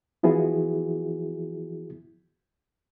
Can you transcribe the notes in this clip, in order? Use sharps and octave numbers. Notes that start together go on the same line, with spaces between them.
E3 F3 B3 E4 F#4 G#4